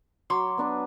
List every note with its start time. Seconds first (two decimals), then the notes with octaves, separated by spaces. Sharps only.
0.30 F#3 C#5 C6 D6
0.58 B3 D4 B4